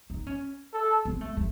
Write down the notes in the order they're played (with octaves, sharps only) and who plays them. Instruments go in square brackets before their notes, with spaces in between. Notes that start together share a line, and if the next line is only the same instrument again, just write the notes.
[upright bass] D#4
C#4
[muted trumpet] A4
[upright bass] C4
A3
A3